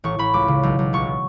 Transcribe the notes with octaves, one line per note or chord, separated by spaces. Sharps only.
A1 C#6
A1 B5
C#2 D6
C#3
B1
B1
C#2 C#6